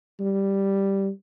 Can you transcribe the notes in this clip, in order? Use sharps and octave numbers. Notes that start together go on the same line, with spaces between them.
G3